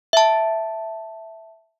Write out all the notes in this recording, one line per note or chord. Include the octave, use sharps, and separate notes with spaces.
E5 A5